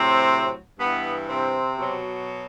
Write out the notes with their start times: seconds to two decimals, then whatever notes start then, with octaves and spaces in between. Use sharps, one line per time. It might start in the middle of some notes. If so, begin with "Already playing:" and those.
Already playing: A2 C3 F#3 C4
0.79 G2 E3 B3
1.29 C3 C4
1.79 B2 F#3